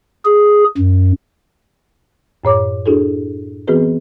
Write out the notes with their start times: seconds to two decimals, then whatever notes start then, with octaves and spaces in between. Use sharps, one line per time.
0.25 G#4
0.77 F#2
2.44 F#2 A2 C#5 D6
2.86 D4 E4 F#4 G#4 A4
3.68 E3 B3 C4 F#4 G#4 B4